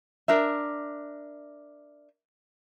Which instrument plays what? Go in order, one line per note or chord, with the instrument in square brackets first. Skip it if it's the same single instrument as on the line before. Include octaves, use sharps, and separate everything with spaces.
[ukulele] D4 A#4 E5